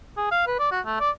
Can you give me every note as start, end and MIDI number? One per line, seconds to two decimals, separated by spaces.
0.17 0.31 68
0.32 0.46 77
0.47 0.59 71
0.59 0.68 74
0.72 0.81 66
0.86 1.00 57
1.00 1.10 74